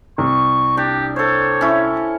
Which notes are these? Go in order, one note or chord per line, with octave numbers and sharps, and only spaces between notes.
C2 C#6
D4 G4
A4 C5 C#5
C#4 E4